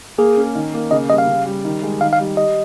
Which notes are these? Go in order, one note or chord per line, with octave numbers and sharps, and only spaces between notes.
A#3 G#4
C#4
D#3
A#3
C#3 D#5
G3 D#5
F5
C#3
G3
D#3
G#3
D#3 F5
F5
G3
G3 D#5